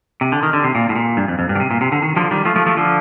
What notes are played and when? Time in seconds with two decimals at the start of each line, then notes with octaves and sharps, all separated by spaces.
0.21 C3
0.32 D3
0.43 D#3
0.53 D3
0.64 C3
0.75 A#2
0.89 A2
0.96 A#2
1.17 G2
1.28 F2
1.39 F2
1.49 G2
1.55 D3
1.60 C3
1.71 A#2
1.81 C3
1.92 D3
2.02 D#3
2.16 D3 F3
2.31 D#3 G3
2.45 F3 A3
2.56 F3 A3
2.66 F3 A3
2.77 D3 F3